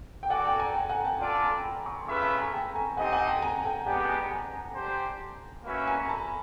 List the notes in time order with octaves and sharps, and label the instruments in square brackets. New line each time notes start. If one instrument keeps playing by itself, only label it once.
[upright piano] G5
[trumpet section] F#4 A4 D5 [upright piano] F#5 G#5
[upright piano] G5 A5
G#5 A#5
G5 A5
F#5 G#5
G5 A5
[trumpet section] D4 F4 A4 D5 [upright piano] G5 A5
[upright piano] G#5 A#5
A5 B5
B5 C#6
C6
[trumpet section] C#4 F4 G#4 B4 E5 [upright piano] B5 C#6
[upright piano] A5 B5
G#5 A#5
G5 A5
G#5 A#5
[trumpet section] C4 D#4 G4 C5 D#5 [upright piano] F#5 G#5
[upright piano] F#5 G#5
G5 A5
G#5 A#5
A#5
G5 A5
[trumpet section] G#3 B3 D4 G4 [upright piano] F#5 G#5
[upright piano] A5
G#5 A#5
G#5 A#5
G#5 A#5
[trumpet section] D4 G4 C5
A#3 C#4 F#4 B4 E5
[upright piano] G#5 A#5
A#5
A5 B5